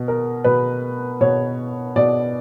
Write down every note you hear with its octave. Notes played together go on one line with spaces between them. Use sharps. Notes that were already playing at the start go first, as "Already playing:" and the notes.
Already playing: B2
A#4
B2 B4
B2 C#5
B2 D5